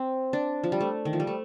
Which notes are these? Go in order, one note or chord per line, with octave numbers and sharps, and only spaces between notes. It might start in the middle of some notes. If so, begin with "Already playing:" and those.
Already playing: C4
D4
F3
G3
A3
D#3
F3
G3
A3